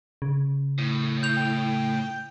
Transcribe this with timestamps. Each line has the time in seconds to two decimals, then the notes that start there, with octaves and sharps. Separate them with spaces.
0.22 C#3
0.78 A2
1.23 G6 F7
1.37 G5